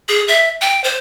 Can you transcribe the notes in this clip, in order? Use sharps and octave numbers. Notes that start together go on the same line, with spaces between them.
G#4
E5
G5
C5